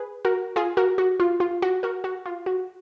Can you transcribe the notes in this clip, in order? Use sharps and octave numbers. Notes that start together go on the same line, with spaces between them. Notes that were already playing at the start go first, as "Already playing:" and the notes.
Already playing: G#4 B4
F#4 A#4
F4 G#4
F#4 A#4
F#4
F4
F4
F#4
F#4 A#4
F#4
F4
F#4